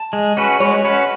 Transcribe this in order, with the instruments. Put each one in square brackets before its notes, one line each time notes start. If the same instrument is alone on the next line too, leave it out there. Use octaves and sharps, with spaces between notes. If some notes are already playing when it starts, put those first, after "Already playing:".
Already playing: [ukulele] A5
[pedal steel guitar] G#3
C#4 F#4 B4
[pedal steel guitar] G#3 [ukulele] C#5
[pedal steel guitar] C#4 F#4 B4